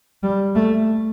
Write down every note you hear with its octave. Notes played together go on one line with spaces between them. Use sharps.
G3
A3